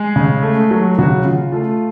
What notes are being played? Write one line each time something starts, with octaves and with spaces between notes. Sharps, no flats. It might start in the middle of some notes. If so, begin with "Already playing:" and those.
Already playing: G#3 G#4
C#3
A3
F#3
C#3 F#3 F#4
C#3 F4
A3 F4